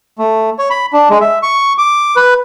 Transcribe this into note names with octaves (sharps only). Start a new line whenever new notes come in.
A3
C#5
B5
D4
G#3
E5
C#6
D6
B4